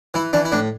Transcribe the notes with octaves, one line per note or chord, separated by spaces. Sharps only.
E3 E4
E3 D4
E4
A2 D4